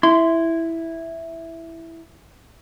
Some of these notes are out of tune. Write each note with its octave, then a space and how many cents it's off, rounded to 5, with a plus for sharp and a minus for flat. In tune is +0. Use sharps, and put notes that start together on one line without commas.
E4 +0 C6 -15